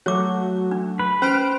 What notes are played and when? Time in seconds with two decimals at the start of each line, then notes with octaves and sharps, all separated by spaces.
0.06 F#3 A3 F#4 C#5 D6
0.71 D4
0.99 B4
1.22 C#4 C5 F6 D7